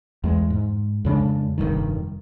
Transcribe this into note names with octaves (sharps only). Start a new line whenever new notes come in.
E2 G#3
G#2
F2 C#3 G#3 D4
F1 C2 G2 D#3